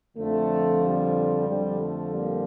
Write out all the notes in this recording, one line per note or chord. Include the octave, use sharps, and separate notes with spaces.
F2 D3 F3 A3
G3
F2 D3 F3 G3
A3
G3 A#3